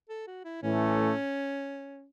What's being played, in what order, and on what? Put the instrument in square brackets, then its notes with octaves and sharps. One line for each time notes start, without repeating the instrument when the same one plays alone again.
[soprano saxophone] A4
F#4
E4
[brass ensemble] A2 E3 A3 [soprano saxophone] C#4